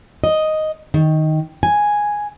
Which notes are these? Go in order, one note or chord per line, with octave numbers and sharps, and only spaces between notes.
D#5
D#3
G#5